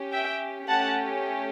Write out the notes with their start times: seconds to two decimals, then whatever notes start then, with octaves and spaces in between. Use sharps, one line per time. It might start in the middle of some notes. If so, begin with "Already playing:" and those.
Already playing: C#4 G4
0.11 E5 G5
0.68 A3 C#4 G4 F#5 A5